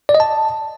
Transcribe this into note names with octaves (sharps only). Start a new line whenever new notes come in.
D5
D#5
A5